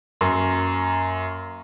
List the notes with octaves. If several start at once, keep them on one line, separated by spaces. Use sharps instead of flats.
F#2 A#3 A#5 C6 C#6